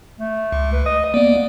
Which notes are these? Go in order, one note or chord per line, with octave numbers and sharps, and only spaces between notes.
A3
C#2
B4
D#5 D#6
A#3 B3 D5